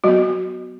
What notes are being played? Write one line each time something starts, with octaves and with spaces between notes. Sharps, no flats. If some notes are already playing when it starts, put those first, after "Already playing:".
F#3 B3 F#4